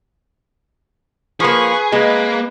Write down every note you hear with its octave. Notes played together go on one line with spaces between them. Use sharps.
F3 A#3 G#4 B4 C#6
G#3 A#3 B4